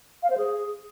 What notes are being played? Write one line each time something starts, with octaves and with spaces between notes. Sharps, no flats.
F5
C5
G#4